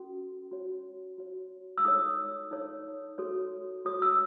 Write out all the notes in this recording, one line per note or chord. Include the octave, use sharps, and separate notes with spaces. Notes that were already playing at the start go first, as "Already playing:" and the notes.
Already playing: C#4 F#4 A4
F#4 C#5
F#4 C#5
E6
D#4 A4 C#5 D#6
D#4 A4 C#5
F#4 A4 C#5
F#4 A4 C#5 D#6
E6